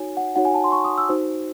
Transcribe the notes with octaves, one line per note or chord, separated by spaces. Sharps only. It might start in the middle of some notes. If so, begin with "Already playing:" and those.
Already playing: D#4 F#4 C#5 G#5
F#5
D#4 F#4 C#5 F#5
G#5
A5
C6
C#6
D#6
E6
D#4 F#4 C5